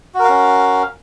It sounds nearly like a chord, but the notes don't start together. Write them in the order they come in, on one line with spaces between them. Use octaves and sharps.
F#4 A#4 F5 C#4